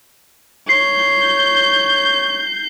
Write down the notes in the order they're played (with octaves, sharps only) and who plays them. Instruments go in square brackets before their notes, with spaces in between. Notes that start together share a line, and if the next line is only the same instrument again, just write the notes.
[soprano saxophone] C#5 [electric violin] G6 [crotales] C7